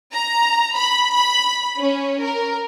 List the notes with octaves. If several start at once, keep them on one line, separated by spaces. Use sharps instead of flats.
A#5
B5
B5
C#4
A#4